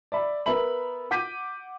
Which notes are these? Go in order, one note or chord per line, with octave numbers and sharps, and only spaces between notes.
D5 E5 B5
B3 A#4 E5 B5 F#7
F#5 D6 G6 B6 D#7